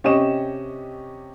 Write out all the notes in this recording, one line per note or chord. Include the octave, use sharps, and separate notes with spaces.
C3 C#4 G4 D#5 C#6 E7